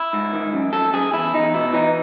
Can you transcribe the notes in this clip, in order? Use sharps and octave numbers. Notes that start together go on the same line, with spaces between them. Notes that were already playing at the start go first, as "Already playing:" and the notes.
Already playing: E4
G#2
D#3
F#2
F#2 A4
F#2 G#4
E2 E4
E2 D#4
B2 E4
E3 D#4